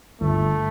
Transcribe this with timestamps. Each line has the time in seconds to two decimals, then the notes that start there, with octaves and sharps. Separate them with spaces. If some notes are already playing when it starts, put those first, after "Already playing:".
0.21 G1 A3